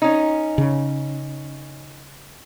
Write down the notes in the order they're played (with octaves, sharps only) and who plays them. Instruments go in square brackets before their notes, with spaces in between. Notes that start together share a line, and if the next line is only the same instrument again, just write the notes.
[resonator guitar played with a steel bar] C#4 D#4
[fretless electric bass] C#3